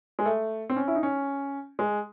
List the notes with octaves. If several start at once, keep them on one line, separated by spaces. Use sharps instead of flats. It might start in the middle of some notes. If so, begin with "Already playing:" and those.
G#3
A3
C4
C#4
E4
D#4
C#4
G#3